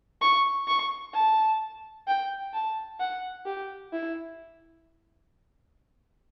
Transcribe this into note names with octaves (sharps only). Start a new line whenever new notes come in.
C#6
C#6
A5
G5
A5
F#5
G4
E4